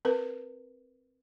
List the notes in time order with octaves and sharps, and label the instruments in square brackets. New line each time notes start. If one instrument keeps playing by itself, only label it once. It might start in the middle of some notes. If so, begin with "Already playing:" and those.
[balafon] C4 A#4 B4